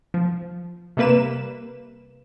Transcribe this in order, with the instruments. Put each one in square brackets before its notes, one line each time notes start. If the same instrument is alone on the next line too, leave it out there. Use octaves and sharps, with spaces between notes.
[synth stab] F3
C3 G3 A#3 B4 E7